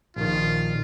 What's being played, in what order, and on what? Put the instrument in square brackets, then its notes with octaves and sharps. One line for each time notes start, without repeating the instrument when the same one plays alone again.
[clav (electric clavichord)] A#1 D#3 [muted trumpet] F4